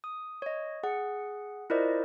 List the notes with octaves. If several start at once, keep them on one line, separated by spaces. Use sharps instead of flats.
D#6
C#5 D#5
G#4 F#5
E4 F4 A#4 C5 D5 D#5